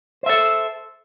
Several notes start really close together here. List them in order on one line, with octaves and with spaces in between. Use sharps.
C5 E5 A4